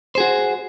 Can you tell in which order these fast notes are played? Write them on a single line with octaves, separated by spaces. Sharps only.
C5 G#4 F#4